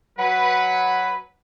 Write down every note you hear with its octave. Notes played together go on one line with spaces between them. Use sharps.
F#3 B4 F#5